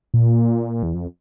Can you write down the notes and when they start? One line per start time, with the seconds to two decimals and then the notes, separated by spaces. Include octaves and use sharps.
0.14 A#2
0.83 E2
0.94 F2